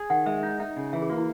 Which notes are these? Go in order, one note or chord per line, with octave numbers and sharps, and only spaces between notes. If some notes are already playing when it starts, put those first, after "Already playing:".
Already playing: G#4
D#3 F#5
G#3 E5
E5
D#4
D#5
D#4 E5
C#3
E3 E5
G#4
A#3 F#4
E4